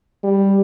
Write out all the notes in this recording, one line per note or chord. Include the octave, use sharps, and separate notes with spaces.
G3